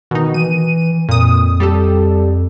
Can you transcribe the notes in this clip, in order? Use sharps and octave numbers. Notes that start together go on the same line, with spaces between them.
B2 D#3 D#4
E3 D#7
F2 A#2 D#6
G3 G4 A4